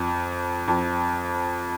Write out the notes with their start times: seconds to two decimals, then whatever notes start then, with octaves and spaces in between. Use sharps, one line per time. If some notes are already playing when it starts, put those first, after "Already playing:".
Already playing: F2
0.68 F2